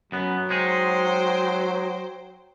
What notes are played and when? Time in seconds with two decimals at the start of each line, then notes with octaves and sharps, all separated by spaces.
0.12 F#2 F#3 B3
0.50 G#3 D#4 G#4 C5 G5